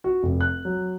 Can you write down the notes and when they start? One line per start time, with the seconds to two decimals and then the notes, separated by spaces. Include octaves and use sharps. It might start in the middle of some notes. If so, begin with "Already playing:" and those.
0.04 F#4
0.23 F1
0.41 F#6
0.65 F#3